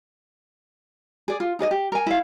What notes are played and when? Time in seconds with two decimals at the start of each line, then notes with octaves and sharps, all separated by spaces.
1.28 G#4 D5
1.40 F4
1.59 D#4 G#4 D5 D#5
1.71 G4
1.92 A#4 G#5
2.06 E4 F5